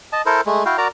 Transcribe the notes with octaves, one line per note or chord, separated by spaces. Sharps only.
D#5 A5
E4 A4 A#4 C5
G#3 A3
E4 F#4 F5 G5
F#4 A#4 D5 A#5